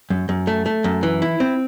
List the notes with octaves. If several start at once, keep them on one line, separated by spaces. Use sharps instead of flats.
F#2
F#2
A3
A3
F#2
E3
E4
C4